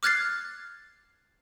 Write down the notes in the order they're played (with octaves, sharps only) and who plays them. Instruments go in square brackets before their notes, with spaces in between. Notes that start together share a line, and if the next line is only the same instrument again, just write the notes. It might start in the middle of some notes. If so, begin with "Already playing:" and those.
[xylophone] D6 F6 F#6 G#6 A6 C7